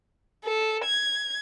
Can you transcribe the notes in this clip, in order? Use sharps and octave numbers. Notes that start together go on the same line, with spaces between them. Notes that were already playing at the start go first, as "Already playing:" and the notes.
A4
G#6